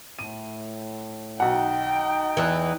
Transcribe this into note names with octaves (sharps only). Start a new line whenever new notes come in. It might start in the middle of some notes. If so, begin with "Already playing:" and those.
A2 D#7
B1 D#4 D#5 F#5 G5
E2 E3